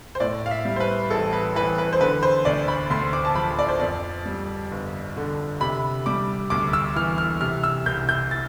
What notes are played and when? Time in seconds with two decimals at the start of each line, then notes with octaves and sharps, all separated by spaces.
0.15 C5
0.20 A2 D5
0.46 F5
0.51 E5
0.65 G3
0.76 C5
0.80 B4
1.10 A1 A4
1.33 B4
1.55 E3 B4
1.78 B4
1.93 C5
2.01 D3 B4
2.23 C5
2.45 D2 D5
2.68 B5
2.90 D2 C6
3.13 D6
3.25 A5
3.35 F3 B5
3.59 D5
3.68 C5
3.80 F2 D5
4.26 G3
4.71 G1
5.16 D3
5.60 C3 B5
6.06 G3 D6
6.50 D2 D6
6.73 E6
6.96 E3 F6
7.18 F6
7.41 C3 F6
7.64 E6
7.86 C2 G6
8.09 G6
8.31 A6